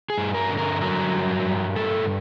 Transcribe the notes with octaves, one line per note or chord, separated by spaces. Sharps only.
G#4
G2
A#4
D3
A#4
F#3 A#4
G2
G2
A2 A4